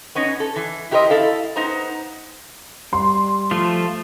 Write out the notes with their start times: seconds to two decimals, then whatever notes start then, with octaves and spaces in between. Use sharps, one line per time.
0.15 B3 C#4 D#4
0.40 A4
0.56 E3
0.91 E4 G4 A#4 C5 D#5
1.10 E4 A4 F5
1.56 B3 D#4 C5 A#5
2.93 G3 C6
3.51 F3 A3 F4